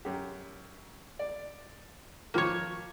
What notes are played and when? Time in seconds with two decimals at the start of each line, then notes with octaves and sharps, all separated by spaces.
0.05 F#2 G4
1.19 D5
2.34 D#3 F3 A#3 C#5